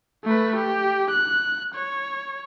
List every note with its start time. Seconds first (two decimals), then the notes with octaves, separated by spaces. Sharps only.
0.24 A3 B4
0.55 G4
1.10 F#6
1.74 C#5